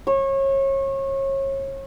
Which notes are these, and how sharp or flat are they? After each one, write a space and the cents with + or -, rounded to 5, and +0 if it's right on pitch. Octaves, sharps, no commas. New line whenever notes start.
C#5 -30